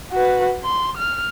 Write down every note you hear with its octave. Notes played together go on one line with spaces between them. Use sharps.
F#4 B4
C6
F6